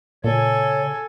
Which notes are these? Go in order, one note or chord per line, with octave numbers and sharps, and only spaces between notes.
A#2 C#3 A4 C#5 G#5